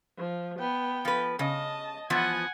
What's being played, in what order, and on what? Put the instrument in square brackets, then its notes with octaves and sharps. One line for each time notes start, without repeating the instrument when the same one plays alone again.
[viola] F3
B3 G5
[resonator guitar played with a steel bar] F3 B4
[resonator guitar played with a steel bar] C#3 [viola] D#5 A5
[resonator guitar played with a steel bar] E3 F3 B3 [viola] F#5 G#5